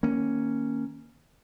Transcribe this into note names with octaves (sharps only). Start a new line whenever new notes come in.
D#3 A#3 C#4